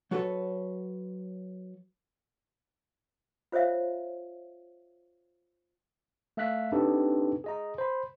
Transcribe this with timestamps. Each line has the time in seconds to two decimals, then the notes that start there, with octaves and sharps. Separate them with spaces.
0.11 F#3 F#4 A4 B4 C#5
3.52 F4 C5 C#5 E5 F5
6.37 A3 E5 F5 F#6 B6
6.72 C4 D4 D#4 G4 A4 B4
7.44 G#4 D#5 A#5
7.78 C5 B5